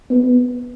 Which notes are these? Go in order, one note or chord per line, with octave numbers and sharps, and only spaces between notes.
B3